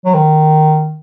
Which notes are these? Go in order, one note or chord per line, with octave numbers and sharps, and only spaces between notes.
F#3
D#3